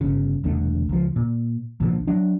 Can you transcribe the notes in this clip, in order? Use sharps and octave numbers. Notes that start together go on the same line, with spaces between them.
G1 C#3
E1 C2 D3 A3
C#2 F3
A#2
C2 A#2 D3 F3
F#3 D4